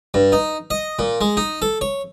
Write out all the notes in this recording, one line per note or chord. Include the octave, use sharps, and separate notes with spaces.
G2
D#4
D#5
A#2
G#3
D#4
A4
C#5